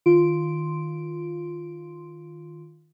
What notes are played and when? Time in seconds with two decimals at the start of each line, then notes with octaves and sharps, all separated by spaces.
0.06 D#3 F4 C6 D7